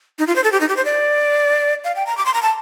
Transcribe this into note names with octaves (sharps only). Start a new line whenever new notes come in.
D#4
F4
C5
A4
G4
D#4
G4
C5
D5
F5
G5
A#5
D6
C6
A#5
A5